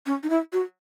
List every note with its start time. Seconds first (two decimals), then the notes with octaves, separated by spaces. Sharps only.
0.06 C#4
0.23 D#4
0.30 E4
0.53 F#4